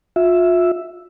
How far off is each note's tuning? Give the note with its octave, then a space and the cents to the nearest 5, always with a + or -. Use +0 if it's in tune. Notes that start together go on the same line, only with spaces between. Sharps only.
F4 +35 E5 +0